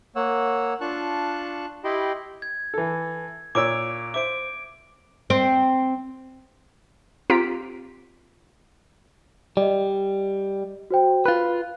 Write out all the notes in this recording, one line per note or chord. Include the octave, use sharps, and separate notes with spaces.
A#3 C#5 F#5 E6
D4 F4 A5 C#6 F#6
E4 G4 D#5 G5 B5 C6
G#6
E3 A4
A#2 C#5 D6 E6 D7
C5 E5 D6 D7
C4
C4 F4 G4 A#5 B6 D7
G3 D5 D#5
F#4 C5 G5
F4 B4 F#6